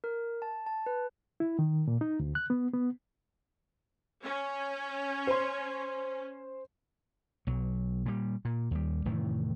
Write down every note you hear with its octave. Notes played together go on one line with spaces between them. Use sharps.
A#4
A5
A5
B4
E4
D#3
A#2
D#4
D2
F#6
B3
B3
C#4
C5 C6
B1 F#3
A#2 G3
A#2
D#2 G3
F1 A2 D#3 E3